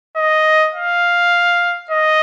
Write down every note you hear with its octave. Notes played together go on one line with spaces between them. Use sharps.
D#5
F5
D#5